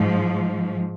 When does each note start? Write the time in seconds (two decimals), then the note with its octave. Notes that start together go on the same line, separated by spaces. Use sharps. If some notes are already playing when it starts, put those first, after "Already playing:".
Already playing: G#2 F3